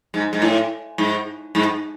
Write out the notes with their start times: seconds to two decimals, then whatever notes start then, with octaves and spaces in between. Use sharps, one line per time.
0.14 G#2
0.33 G#2
0.42 A2
0.98 G#2
1.55 G#2